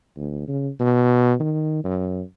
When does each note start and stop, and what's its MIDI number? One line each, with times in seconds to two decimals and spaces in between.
0.16 0.45 38
0.48 0.69 49
0.79 1.34 47
1.40 1.79 51
1.84 2.21 42